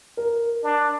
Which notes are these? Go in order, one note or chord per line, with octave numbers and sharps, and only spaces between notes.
A#4
D4